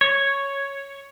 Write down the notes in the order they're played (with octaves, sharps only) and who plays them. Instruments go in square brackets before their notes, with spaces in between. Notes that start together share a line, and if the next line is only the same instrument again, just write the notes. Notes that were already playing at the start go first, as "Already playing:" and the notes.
[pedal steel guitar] C#5